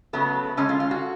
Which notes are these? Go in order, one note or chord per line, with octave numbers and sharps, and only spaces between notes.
C#3 F#3 A3 B3
D3 G#3 C#4
F4
F4
F#4